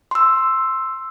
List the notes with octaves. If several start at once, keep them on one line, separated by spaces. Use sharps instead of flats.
C6 E6